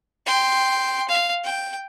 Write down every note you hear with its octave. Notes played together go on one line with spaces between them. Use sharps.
G5 C6
F5
G5